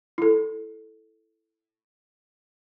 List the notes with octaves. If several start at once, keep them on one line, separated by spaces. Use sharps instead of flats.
E4 A4